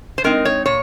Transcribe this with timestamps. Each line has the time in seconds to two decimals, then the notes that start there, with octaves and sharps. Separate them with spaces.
0.18 C5
0.24 G#3 C4 D#4 A#4
0.45 C#5
0.66 A#2 C#5